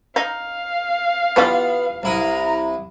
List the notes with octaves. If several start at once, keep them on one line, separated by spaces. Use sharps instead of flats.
D#4 F5
E3 G3 B3 F4
C2 E4 A#5 D#6